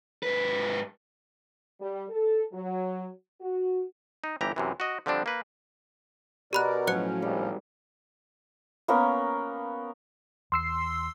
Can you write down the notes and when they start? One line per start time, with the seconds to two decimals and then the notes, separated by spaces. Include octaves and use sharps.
0.23 G#2 B4
1.80 G3
2.10 A4
2.53 F#3
3.41 F#4
4.24 D#4
4.41 G1 E3 G4 A#5
4.56 F#2 C3 E3
4.80 F#4 D#5
5.06 D3 F3 G3 C4 D4
5.26 A#3 B4
6.53 B2 G4 A#4 D5 B5 F#6
6.87 A2 F3 F#3 C#4 C5 F#6 C#7
7.22 G#1 D#2 G3
8.88 A#3 B3 C#4 A#4
10.52 E2 C6 E6 C7